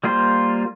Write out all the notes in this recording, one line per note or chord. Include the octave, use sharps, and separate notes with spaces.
G3 A#3 F4 C5